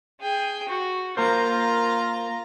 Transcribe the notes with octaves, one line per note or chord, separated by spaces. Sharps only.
G#4 G5
F#4
A#3 F4 A#4 C5 A#5